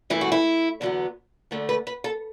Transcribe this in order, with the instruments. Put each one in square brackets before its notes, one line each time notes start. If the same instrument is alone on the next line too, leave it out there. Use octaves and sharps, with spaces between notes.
[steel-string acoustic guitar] G2 E3 A3 E4
F#4
E4
E2 D3 F#3 B3
D2 D3 A3 D4
B4
B4
A4